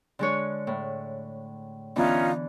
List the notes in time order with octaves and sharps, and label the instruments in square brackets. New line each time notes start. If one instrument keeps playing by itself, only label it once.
[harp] D3 G#3 C#5
A2
[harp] D3 E3 B3 [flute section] C#4 D#4 F4